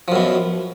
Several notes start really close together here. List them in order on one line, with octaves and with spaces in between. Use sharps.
F3 F#2 B2